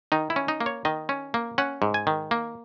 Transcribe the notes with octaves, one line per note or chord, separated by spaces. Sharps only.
D#3 D#4
E4
C#4
D#4
A#3
C#5
D#3 D#5
C#4
A#3
C#4 F#5
G#2
G#5
D#3
A#3